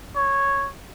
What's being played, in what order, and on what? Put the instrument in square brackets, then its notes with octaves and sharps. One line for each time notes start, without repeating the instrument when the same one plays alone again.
[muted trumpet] C#5